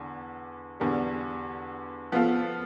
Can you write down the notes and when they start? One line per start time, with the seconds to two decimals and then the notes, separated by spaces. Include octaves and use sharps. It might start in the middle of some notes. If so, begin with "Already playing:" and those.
Already playing: E2 D3
0.80 E2 D3 G3
2.12 F3 B3 F4 A4